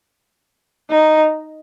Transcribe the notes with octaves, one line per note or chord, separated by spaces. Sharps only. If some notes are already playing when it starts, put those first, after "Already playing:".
D#4